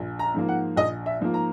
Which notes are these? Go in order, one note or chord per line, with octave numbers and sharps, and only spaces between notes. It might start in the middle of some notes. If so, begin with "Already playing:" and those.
Already playing: A#1
A#5
G#2 F3 A#3
F#5
A#1 D#5
E5
G#2 F3 A#3
A#5